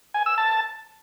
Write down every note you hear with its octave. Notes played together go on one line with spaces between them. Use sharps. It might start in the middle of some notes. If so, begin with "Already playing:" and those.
G#5
E6
A5